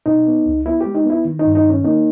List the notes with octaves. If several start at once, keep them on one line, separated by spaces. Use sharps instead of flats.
B2 D#4
B3
C#2
B3 E4
G#3 G4
D#4
B3
E4
D#3
G2 D#4
D#4
D#3
C#4
A#3 D#4